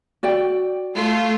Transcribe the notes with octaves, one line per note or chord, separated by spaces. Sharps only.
F#4 D5 G5
A3 F4